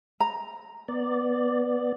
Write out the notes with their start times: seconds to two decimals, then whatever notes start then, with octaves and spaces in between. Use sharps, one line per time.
0.20 A#5
0.88 B3 D5